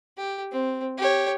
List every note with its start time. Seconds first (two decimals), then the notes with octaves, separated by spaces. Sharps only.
0.18 G4
0.52 C4
0.98 G4 C#5